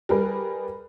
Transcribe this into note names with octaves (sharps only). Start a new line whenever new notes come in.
G3 G#4 A#4 B4